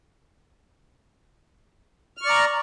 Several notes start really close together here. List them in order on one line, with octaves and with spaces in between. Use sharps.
F6 C#6 D5 A#5